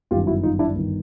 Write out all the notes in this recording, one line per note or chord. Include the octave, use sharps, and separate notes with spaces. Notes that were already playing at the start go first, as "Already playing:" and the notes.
G1 F#2 D#3 F4 G4
E4 F#4
D#4 F4
D4 E4
G1 D#3